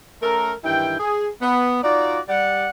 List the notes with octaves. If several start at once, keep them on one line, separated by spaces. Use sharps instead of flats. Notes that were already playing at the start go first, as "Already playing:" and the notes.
A3 C#4 A4 A#4
G2 D#3 E3 E4 G5
G#4
B3
D#4 F4 F#4 D5
G3 D5 F#5